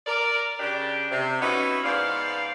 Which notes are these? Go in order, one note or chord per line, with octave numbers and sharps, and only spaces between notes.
A#4 D5
C#3 D4 G4
C3
B3 C#4 D#4 E4 F#4 B4
G#2 B3 C5 D5 F5